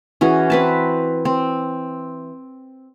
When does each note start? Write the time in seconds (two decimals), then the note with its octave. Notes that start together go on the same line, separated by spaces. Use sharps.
0.21 E3 C#4 F#4 G#4
0.50 C4 B4 A5
1.25 C4